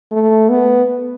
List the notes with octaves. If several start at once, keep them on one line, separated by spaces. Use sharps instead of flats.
A3
B3